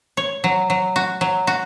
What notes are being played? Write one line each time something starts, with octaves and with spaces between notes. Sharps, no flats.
C#5
F#3
F#3
F#4
F#3
F#4